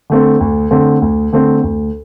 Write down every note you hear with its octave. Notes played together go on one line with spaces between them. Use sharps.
D3 A3 C4
D2
D3 A3 C4
D2
D3 A3 C4
D2